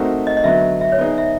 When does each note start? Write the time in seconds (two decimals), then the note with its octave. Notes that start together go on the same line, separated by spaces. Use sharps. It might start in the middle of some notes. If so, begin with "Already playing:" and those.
Already playing: A3 C4 D#4 F#4 A#4
0.27 D#5
0.37 D#5
0.44 D3 F#3 B3 E5
0.81 E5
0.92 C#5
0.98 B3 D#4 G#4 D5
1.18 E5